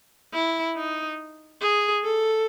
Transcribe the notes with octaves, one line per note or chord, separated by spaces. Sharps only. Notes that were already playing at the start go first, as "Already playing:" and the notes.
E4
D#4
G#4
A4